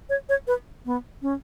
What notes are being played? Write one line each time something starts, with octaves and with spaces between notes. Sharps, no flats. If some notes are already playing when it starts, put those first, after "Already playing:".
C#5
C#5
B4
B3
C#4